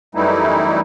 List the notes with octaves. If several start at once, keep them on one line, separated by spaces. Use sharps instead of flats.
F#2 E3 G3 A3 D#4 E4